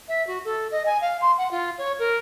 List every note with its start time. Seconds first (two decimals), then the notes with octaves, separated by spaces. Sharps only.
0.09 E5
0.27 F#4
0.45 A4
0.71 D#5
0.86 G#5
1.01 F5
1.21 C6
1.38 F#5
1.51 F4
1.78 C#5
1.99 A#4